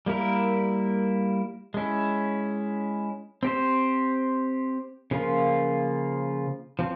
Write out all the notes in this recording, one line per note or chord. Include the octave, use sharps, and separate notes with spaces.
G3 A#3 E4 A#4
G#3 C#4 E4
C4 G4 C5
C#3 F3 A#3 F4
F3 C4